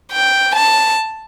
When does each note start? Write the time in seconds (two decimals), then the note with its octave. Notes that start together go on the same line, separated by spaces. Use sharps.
0.12 G5
0.55 A5